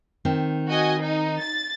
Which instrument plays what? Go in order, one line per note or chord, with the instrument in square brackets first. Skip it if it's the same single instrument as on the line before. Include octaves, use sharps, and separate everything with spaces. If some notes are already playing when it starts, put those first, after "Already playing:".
[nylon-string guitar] D#3 C4
[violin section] F#4 D#5 G#5
D#4
A6